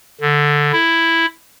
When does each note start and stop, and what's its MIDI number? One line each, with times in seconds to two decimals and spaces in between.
0.21 0.72 50
0.73 1.26 64